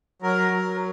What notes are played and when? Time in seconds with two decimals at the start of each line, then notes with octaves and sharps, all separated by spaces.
0.22 F#3 A#4
0.53 F#3